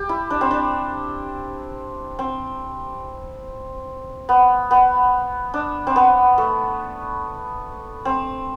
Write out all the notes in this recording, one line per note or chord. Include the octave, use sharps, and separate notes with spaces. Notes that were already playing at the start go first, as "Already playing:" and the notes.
Already playing: G4
E4
D4
C4
D4
C4
B3
B3
D4
C4
B3
A3
C4